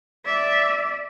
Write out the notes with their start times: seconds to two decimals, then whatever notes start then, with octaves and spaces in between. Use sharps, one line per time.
0.25 D5 E5